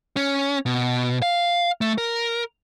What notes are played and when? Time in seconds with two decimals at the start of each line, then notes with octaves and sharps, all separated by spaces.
0.16 C#4
0.66 B2
1.22 F5
1.81 A3
1.98 A#4